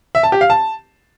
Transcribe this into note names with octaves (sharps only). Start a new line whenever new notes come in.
E5
A5
G4
F5
A5